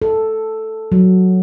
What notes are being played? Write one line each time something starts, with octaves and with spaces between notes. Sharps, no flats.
A4
F#3